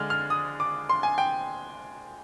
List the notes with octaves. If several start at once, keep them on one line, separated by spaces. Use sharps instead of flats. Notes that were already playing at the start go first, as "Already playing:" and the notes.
Already playing: D3 G#3 D4 F6
F6
D#6
D6
C6
G#5
G5